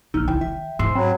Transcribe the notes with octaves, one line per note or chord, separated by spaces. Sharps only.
A#1 D#4 E6 F6
C#2 E4 G5
D#3 E5
G#2 C6 E6 C7
F#3 C4 G5 B5